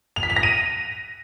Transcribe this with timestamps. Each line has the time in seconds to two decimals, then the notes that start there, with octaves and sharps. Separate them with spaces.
0.16 F7
0.23 B6
0.30 F7
0.36 A#6
0.43 D#7